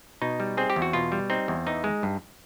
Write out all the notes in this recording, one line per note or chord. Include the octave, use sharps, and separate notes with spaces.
B2 D#4
G3
C4 G#4
G4
E2
F#4
B2 F4
G3
C4 D#4
E2
E3 D#4
G#3
G2